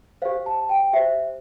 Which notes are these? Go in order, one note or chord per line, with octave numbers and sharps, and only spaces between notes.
G4 C5 F5
A5
G5
G4 C5 E5